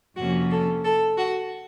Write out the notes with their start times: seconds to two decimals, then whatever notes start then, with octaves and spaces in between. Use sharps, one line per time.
0.17 F2 C3 F3 A#3 C#4 F#4
0.51 A4
0.84 A4
1.18 F#4